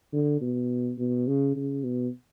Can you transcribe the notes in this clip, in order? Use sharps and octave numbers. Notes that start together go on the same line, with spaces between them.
D3
B2
B2
C#3
C#3
B2